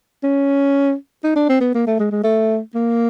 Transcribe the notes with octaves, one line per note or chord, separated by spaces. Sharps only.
C#4
D#4
D4
C4
B3
A#3
A3
G#3
G#3
A3
A#3